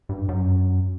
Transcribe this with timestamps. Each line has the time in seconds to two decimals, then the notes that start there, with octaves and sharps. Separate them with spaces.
0.09 G2
0.29 F#2